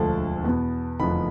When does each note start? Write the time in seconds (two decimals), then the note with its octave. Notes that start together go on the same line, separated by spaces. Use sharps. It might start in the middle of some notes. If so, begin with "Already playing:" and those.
Already playing: E1 D2 D3 F3 A3 A5
0.44 E2 B2 B3
1.00 F1 E2 D3 F3 B3 B5